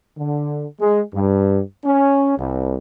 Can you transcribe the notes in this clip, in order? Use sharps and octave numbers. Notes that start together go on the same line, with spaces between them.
D3
G#3
G2
C#4
C2